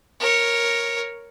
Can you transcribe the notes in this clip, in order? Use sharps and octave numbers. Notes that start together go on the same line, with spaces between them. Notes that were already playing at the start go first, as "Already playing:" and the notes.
A#4 C#5